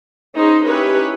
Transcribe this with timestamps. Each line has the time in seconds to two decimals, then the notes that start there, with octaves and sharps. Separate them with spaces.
0.35 C#4 D#4 G#4 C5
0.66 C#4 D#4 E4 G4 B4 C#5